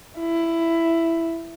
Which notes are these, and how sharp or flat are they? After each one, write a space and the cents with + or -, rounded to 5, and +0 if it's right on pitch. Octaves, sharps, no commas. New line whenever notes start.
E4 +10